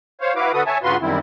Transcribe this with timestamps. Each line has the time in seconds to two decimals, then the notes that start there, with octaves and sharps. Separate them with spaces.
0.21 C5 C#5 F5
0.36 E4 F#4 B4 F5 D6
0.53 D3 F#4 A4 B4 D#6
0.66 C#5 E5 G#5 A5
0.83 G2 C#3 F4 F#4 B4 C6
1.01 F#2 D3 D#3 G3 C4 E4